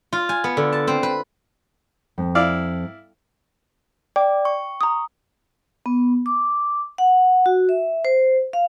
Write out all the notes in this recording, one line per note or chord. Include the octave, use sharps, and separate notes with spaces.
F4
G#5
B3
D3
A5
C4
B4
F2
E4 D5 F5
D5 G5 D6
C#6
A#5 D#6
B3
D6
F#5
F#4
E5
C5
F5